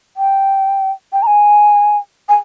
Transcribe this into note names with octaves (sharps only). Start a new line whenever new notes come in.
G5
G5
A#5
G#5
G#5